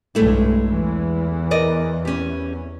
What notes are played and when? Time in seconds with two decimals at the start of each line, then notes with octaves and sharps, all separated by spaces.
0.15 B1 G2 G#3 A3 E4
0.68 E2 E3
1.51 A#4 D5 D#5
2.05 C#4 G4